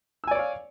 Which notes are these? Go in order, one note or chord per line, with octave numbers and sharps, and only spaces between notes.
C#5 D5 F5 G#5 E6